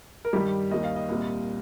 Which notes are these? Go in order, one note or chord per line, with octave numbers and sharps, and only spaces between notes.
A#4
G2 D#3 G3 G4
D#2 D#3 G3 D#5
F5
D#5
C2 A#2 G3